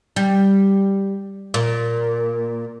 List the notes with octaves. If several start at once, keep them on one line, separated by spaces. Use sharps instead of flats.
G3
A#2